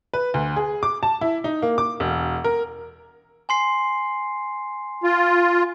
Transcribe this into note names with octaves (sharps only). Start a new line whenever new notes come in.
B4
D2
G#4
D6
A5
E4
D#4
A#3
D6
E1
A#4
G#5 C6 C7
F4